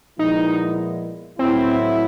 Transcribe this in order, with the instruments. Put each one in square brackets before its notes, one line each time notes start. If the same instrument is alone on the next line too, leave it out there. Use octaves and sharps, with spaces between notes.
[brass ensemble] A#2 F3 G#3 B3 E4 [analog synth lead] D#4
[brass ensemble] A2 F#3 B3 E4 [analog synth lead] C4